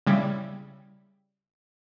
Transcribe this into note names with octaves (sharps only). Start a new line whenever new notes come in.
C#3 G3 E4